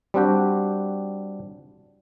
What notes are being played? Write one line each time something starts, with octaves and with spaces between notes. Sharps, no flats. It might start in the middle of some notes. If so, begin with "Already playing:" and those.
G3 C4 D4 F#4 G4